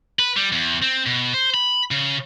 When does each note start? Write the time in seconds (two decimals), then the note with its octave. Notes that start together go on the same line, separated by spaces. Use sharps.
0.19 B4
0.36 G3
0.52 E2
0.82 C4
1.06 B2
1.34 C5
1.54 B5
1.91 C#3